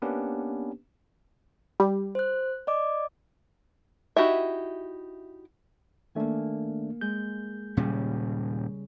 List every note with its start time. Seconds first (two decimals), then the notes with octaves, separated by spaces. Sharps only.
0.02 A#3 B3 C#4 D4 G4 B4
1.80 G3
2.15 C5 F#6
2.67 D5 D#5 D6
4.16 D#4 E4 F#4 G4 E5
6.15 D#3 A3 A#3 D4 G#5
7.01 G#3 G6
7.77 D#1 A#2 C#3 G3 C#4